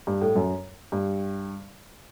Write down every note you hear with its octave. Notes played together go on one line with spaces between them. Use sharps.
G2
A2
F#2
G2